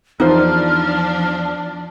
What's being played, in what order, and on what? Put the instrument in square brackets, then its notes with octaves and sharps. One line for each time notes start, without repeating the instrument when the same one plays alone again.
[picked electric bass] E2 [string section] F3 D4 [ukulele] D#4 F4 C5 [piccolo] F6